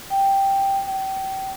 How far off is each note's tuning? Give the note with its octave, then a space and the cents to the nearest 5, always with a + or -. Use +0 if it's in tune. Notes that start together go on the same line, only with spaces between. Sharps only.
G5 +0
G5 -30